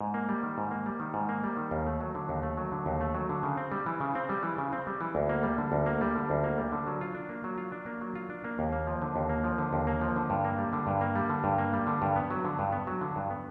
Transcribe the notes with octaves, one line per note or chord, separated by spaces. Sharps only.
G#2
A#3
G3
D#3
G#2
A#3
G3
D#3
G#2
A#3
G3
D#3
D#2
A3
F#3
D3
D#2
A3
F#3
D3
D#2
A3
F#3
D3
C#3
C4
G3
E3
C#3
C4
G3
E3
C#3
C4
G3
E3
D2
A#3
G3
D3
D2
A#3
G3
D3
D2
A#3
G3
D3
F#3
F4
D4
A#3
F#3
F4
D4
A#3
F#3
F4
D4
A#3
D#2
A#3
F3
D3
D#2
A#3
F3
D3
D#2
A#3
F3
D3
G2
A#3
G3
D3
G2
A#3
G3
D3
G2
A#3
G3
D3
G2
B3
F#3
D3
G2
B3
F#3
D3
G2
B3